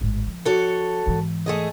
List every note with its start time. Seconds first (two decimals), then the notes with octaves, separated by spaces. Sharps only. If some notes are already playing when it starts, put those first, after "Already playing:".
0.01 G#1 A2
0.27 F3
0.45 F#4 A4 C#5
1.06 G#2 E3
1.46 A3 G#4 D#5